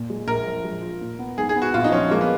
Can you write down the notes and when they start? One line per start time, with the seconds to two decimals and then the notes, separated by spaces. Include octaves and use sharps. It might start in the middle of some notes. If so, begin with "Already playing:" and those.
Already playing: A#2
0.10 G#3
0.27 A#1 A#4
0.46 F3
0.64 G#3
0.82 F4
1.01 A#2
1.19 B3
1.38 G#2 G#4
1.49 G#4
1.56 B3
1.62 F#4
1.74 A#1 F4
1.84 D#4
1.92 F3 C#4
2.11 G#3 A#3
2.21 B3